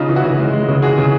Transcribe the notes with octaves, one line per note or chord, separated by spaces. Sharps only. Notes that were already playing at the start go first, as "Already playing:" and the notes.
Already playing: C#3 D#4 F4
E3
E4 F#4
C#3
G#3
G#3
C#3
E3 F#4 G#4
C#3